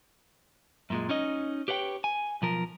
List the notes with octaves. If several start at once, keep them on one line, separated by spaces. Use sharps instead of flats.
F#2 A#2 G#3
C#4 D#4 D#5
G4 B4 C#5 F#5 G5
G#5
B1 F3 A#4